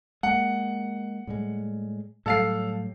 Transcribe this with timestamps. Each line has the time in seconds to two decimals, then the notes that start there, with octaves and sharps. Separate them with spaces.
0.23 G#3 A#3 F#5
1.27 A2 G3 G#3
2.26 A2 F#3 G3 A4 F5 C7